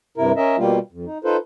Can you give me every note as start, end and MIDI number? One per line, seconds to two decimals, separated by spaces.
0.18 0.32 43
0.18 0.32 48
0.18 0.32 64
0.18 0.32 70
0.37 0.56 61
0.37 0.56 70
0.37 0.56 75
0.37 0.56 76
0.58 0.79 47
0.58 0.79 55
0.58 0.79 58
0.58 0.79 65
0.92 1.05 41
1.06 1.18 63
1.24 1.37 63
1.24 1.37 65
1.24 1.37 69
1.24 1.37 71
1.24 1.37 72